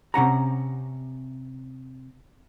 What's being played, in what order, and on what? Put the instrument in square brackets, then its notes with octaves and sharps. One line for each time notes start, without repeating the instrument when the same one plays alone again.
[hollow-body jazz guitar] C3 C#4 F#5 A#5